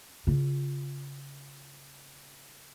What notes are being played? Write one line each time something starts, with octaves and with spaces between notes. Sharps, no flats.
C#3 F4